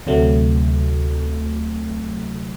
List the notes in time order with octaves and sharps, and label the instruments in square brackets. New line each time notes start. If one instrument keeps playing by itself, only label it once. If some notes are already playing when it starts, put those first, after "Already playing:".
[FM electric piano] D2 C3 F#3 A3